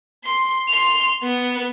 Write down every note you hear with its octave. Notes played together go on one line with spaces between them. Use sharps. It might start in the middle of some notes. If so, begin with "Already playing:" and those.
C6
C6 F7
B3